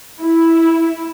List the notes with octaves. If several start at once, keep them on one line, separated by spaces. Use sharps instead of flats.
E4